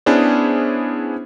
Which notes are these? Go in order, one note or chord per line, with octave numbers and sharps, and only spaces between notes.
B3 C#4 D4 E4 G#4 C5